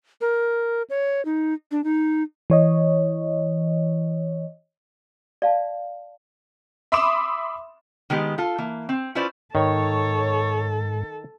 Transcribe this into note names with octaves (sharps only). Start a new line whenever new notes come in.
A#4
C#5
D#4
D4
D#4
E3 C#5 D#5
D5 F5 A5
E5 B5 C6 D6 D#6 E7
D#3 G#3 B3 G4
F4 A4
E3 A#3
C4
C#4 E4 F4 B4 C5 D5
G#2 D#3 A4 C#5